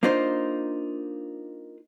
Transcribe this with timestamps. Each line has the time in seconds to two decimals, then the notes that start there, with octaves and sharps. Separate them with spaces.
0.03 A#3 D4 D#4 F4 C5